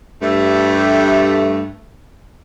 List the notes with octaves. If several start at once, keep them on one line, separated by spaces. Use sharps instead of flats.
G2 A3